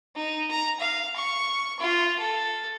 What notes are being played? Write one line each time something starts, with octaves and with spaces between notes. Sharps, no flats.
D#4
A#5
F5
C#6
F4
A4